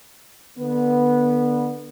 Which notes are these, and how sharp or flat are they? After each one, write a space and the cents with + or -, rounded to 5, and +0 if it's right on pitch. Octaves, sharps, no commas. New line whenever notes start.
D3 +15 B3 -15